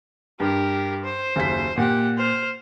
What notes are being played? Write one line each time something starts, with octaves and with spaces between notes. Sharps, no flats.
G2 G4 A#4
C5
F#1 D#2 B6
A#2 G4 F#5
C5 F6